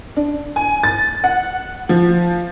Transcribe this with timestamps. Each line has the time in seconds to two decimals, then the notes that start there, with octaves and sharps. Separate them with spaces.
0.16 D4
0.56 G#5
0.83 A6
1.24 F#5
1.89 F3